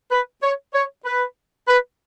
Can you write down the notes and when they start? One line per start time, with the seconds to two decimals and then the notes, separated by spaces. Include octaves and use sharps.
0.12 B4
0.43 C#5
0.74 C#5
1.05 B4
1.68 B4